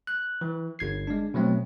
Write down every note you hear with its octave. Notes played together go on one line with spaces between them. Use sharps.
F#6
E3
G1 G#6 C7
G#3 D4
B2 F#3 A3 C4